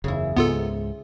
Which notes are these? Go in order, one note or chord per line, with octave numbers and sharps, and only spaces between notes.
F#1 E2 C#3 E4
C#2 G#2 G#3 B3 F4 A4